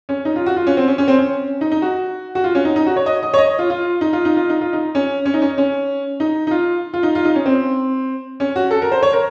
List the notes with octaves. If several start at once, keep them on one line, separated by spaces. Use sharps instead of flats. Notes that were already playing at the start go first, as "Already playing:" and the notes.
C#4
D#4
F4
F#4
F4
C#4
C4
C#4
C#4
C4
C#4
D#4
D#4
F#4
F#4
F4
C#4
D#4
D#4
F#4
C#5
D#5
D#5
C#5
D#5
F4
F4
D#4
F4
D#4
F4
D#4
F4
D#4
C#4
C#4
D#4
C#4
C#4
D#4
D#4
F4
F4
D#4
F4
D#4
C#4
C4
C#4
F#4
A4
A#4
C5
C#5
A#4